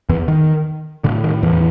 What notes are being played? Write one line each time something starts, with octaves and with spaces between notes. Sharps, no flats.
E2 E3
D#3
A2 D3
D#3
E2 E3